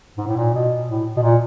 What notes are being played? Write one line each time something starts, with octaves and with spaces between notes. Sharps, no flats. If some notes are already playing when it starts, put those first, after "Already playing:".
G#2
A2
A#2
B2
A2
B2
A#2